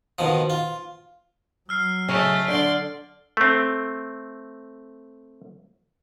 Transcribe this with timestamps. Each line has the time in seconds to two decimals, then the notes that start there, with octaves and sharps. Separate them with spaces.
0.19 B2 D#3 F3
0.50 F4
1.69 F#3 E6 F6 C7
2.08 C#3 A3 D#5
2.48 D3 D5 C6 D7
3.37 A3 C4